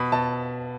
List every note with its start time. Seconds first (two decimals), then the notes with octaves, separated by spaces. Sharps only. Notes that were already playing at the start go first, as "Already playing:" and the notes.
Already playing: B2 B5
0.12 B2 A5